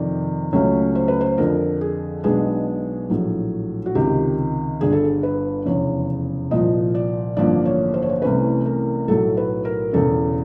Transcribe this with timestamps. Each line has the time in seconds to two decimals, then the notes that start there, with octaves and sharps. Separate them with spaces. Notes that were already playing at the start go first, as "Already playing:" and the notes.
Already playing: F2 C3 D#3 D5
0.53 C#2 C#3 F#3 A3 C#4 C#5
0.95 C5
1.08 B4
1.21 C5
1.38 F2 D3 F3 A#4
1.81 G#4
2.23 B1 B2 G#3 B3 D4 G#4
3.10 A#1 A2 F#3
3.86 F#4
3.95 C#2 C3 D#3 G4
4.81 G1 G2 D3 G#4
4.93 A4
5.04 G#4
5.23 B4
5.66 F1 E2 C#3 C#5
6.51 C2 A#2 F3 D#5
6.95 D5
7.37 A1 G2 D3 F3 A#3 D5
7.65 C#5
7.94 C5
8.02 C#5
8.09 C5
8.22 C2 C3 E3 A3 C#4 B4
8.66 A#4
9.08 B1 A2 F#3 A4
9.37 B4
9.65 A#4
9.93 E1 E2 C#3 A4